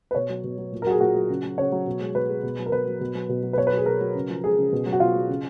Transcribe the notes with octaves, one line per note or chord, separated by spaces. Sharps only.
B4
B2 C#5
F#3
B2
F#3
A#2
F#3 F#4 A#4
G#4
A#2 F#4
F#3
C#3
F#3
C#3 C#5
F#3
B2
G#3
B2 B4
G#3
B2
F#3
A#4
B2 B4
F#3
B2
F#3
B2
F#3
B4
B2 C#5
B4
F#3 G#4
B2 A#4
F#3
C#3
F3
G#3 G#4
C#3
B2
F#3
F#4
B2 F4
F#3
C#3